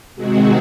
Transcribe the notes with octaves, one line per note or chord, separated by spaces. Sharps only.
C3 D#3 G#3 C4 F#4